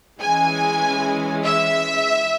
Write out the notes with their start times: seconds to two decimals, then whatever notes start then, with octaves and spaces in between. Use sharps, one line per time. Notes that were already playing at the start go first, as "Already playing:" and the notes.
0.20 E3 G#3 C#4 G#5
1.45 E5